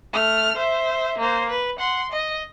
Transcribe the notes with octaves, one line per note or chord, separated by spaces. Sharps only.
A3 F6
C5 E5
A#3 C5
B4
F#5 C6
D#5